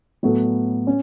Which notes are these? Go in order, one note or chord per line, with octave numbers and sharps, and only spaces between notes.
A2 F#3 B3 F#4 A4
C#4